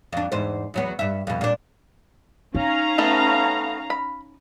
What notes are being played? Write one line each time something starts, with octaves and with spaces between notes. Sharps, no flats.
F2 D4
E2 G#2 C5
E2 F#3 B3
G2 E5
F2 B2
A#2 D4
C#4 D#4 F5 A#5
A3 B3 A4
B5